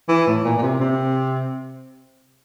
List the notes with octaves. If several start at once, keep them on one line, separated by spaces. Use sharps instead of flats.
E3
A2
A#2
A#2
C3
C3